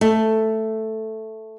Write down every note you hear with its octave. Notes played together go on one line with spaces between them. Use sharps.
A3